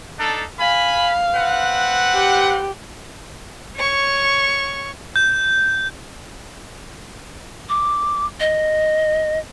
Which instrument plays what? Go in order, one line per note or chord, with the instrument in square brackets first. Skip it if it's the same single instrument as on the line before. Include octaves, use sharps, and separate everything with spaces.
[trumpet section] D4 D#4 A4
[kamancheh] F5 [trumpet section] G#5 B5
[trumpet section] C4 B4 F#5
[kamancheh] G4
[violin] C#5 C#6
[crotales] G6
[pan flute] D6
D#5